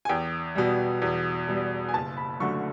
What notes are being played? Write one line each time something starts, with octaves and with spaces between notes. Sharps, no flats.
G#5
E2 G5
B2 G3
E2
B2 G3
G#5
F#1 A5
B5
F#2 D3 F#3 A3 C#6